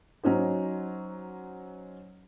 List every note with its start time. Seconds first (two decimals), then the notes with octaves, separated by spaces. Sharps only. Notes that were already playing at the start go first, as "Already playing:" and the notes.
0.23 F#3 C#4 D#4 C5